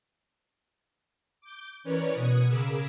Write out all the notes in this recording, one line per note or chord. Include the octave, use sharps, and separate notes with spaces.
D6 G6
E3 C#4 A#4 B4 C#5 D5
B2 F#5 D#6 G#6
C#3 G#4 A#4 B5 D6 E6